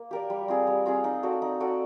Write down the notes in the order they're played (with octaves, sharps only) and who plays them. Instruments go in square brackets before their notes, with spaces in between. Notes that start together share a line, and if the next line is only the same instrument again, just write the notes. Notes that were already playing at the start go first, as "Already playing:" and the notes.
Already playing: [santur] A#3
G4 A#4 D5
G3
C4 F4 G#4
G3
C4 F4 G#4
D#4
F#4 A4 D5
D#4
F#4 A4 D5